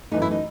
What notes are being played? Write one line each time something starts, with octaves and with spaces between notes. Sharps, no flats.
F#2 E3 A3 D#4
E4
D#4